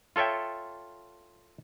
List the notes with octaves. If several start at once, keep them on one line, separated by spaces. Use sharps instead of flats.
F4 A4 C#5 E5 G5